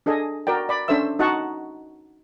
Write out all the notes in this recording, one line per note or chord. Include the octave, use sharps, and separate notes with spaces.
D4 G#4 A4 D#5 G#5
F#4 A#4 D5 G5
D5 B5
C#4 D4 A4 C5 E5 E6
D#4 F#4 D#5 F#5 A5 C#6